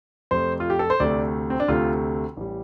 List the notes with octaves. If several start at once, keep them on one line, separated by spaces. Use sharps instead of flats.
F2 C3 A3 C5
F4
G4
A4
C5
D2 C3 A3 D5
C4
D4
D2 C3 A3 F4
A1 G3